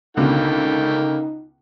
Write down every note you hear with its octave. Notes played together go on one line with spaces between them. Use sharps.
C#2 B2 D3 A3 A#3 D#4 G5